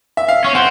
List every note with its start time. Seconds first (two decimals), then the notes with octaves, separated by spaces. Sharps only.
0.17 E5
0.28 F5
0.44 C#4
0.55 C4 F#5